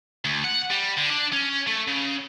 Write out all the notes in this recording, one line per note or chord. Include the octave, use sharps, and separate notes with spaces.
D2
F#5
G3
D3
D4
C#4
A3
C#3